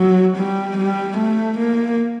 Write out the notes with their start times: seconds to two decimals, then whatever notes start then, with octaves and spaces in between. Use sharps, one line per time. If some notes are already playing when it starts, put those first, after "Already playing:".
Already playing: F#3
0.37 G3
0.77 G3
1.17 A3
1.58 A#3